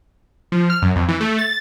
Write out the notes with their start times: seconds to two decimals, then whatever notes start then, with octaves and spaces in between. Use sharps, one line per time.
0.52 F3
0.70 F6
0.82 F#2
0.96 F2
1.09 E3
1.21 A3
1.39 A6